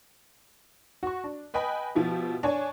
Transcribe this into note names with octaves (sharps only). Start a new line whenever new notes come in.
F#4 C#6
D4
B4 D#5 G5 G#5 B5
B2 F3 E4 G4
D4 C#5 G#5